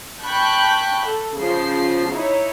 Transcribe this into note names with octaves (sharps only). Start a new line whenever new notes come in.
G5 A5 B5 C#6 F#6 G6
A4
C#3 F3 C5 C7
D#4 E4 C#5